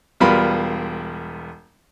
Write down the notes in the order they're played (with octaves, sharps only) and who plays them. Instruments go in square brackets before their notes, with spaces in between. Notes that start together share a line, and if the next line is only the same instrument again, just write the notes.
[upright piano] E1 G3 B3 F4 A#4 B5